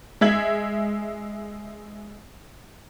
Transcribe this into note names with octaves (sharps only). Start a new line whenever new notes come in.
G#3 E5 G#6 F#7